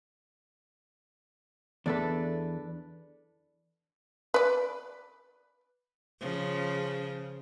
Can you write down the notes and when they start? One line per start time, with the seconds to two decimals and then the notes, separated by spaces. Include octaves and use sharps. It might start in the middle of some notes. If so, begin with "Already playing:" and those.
1.86 E2 D4 A4 B4
4.34 B4 D5
6.20 C#3 F3